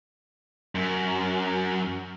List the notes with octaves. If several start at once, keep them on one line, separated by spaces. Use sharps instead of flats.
F#2